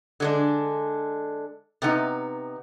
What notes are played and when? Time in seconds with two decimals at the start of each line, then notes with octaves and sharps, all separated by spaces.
0.20 D3 G#3 D4
1.82 C3 B3 D#4